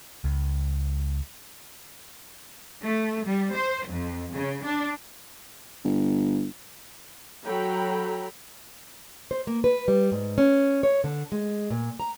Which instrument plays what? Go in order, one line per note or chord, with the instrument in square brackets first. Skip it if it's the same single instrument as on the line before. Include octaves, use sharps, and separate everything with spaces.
[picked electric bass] C#2
[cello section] A3
G3
C5
F2
C#3
D4
[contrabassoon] G1
[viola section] F#3 A4 G5 A#5 B5
[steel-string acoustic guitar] C5
A#3
B4
G3
G#2
C#4
C#5
D3
G#3
A#2
A#5